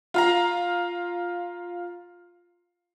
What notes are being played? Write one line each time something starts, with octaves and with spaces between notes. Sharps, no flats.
F4 F5 A#5